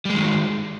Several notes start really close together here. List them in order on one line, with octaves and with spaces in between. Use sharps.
G3 G#3 D#3